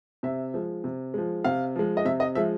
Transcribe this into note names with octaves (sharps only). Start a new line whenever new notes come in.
C3 E5
F3 G#3
C3
F3 G#3
C3 F5
F3 G#3
D#5
C3 E5
D#5
F3 G#3 E5